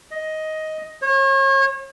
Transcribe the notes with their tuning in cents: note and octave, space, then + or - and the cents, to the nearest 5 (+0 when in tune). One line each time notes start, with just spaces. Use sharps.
D#5 +10
C#5 -35